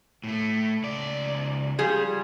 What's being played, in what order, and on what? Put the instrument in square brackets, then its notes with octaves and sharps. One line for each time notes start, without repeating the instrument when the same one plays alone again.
[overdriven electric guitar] A2 A3
C#2 D5
[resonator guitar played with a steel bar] F3 G3 G#4